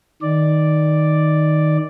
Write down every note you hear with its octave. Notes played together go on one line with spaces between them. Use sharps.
D#3 D5